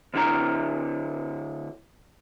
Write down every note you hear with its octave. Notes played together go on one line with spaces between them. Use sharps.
D2 D3 E4 A#5